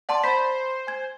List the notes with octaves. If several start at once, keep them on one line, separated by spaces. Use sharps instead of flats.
D5 F#5 A5 C6
C5 B5 B6
G#5 G#6